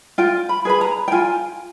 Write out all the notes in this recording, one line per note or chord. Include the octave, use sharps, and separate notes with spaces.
F4 G5
B5
G#4 B4 B5
A#5
G5
F4 G#5